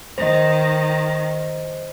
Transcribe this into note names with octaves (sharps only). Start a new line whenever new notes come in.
D#3 C5 D#5